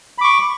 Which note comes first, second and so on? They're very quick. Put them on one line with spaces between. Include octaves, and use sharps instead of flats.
B5 D6 C#6